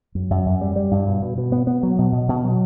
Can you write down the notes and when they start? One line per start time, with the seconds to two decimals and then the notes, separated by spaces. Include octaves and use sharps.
0.15 F#2
0.30 F#2
0.46 F#2
0.61 G3
0.76 G3
0.91 G2
1.07 B2
1.22 B2
1.38 B2
1.52 B3
1.67 B3
1.83 F#3
1.98 B2
2.12 B2
2.29 B2
2.44 F#3